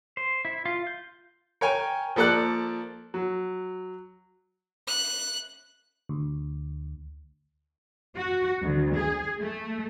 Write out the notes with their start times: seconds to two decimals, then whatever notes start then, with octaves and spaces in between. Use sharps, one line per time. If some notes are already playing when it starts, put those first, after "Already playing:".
0.17 C5
0.45 E4
0.66 F4
0.87 G6
1.61 A#4 C#5 G5 G#5
2.16 F3 A#3 A4 D5 F#6
3.14 F#3
4.87 F#6
6.09 D2
8.16 F#4
8.63 D2
8.98 G#4
9.41 A3